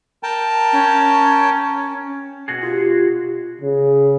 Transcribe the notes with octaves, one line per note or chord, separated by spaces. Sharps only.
A#4 G5 A5
C#4
B2 F#4 G#4
F4 G4
C#3